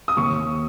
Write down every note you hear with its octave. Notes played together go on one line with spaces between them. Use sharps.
D#6
D#2 C#6